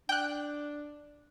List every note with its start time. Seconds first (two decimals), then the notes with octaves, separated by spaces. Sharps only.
0.09 D4 G5 F#6